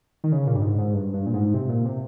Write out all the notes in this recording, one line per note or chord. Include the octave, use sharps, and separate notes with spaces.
D#3
C#3
A#2
G2
G#2
G#2
G2
G2
A#2
G#2
C3
A#2
C3